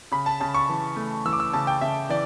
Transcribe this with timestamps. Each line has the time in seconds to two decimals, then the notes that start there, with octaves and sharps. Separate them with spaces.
0.12 C#3 B5
0.26 A5
0.40 C#3 A5
0.55 C#6
0.69 E3
0.96 A3
1.25 E3 E6
1.33 D6
1.40 E6
1.53 C#3 A5
1.67 G5
1.81 C#3 E5
2.09 E3 D5